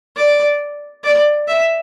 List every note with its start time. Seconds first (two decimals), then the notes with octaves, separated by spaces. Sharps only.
0.16 D5
1.04 D5
1.48 E5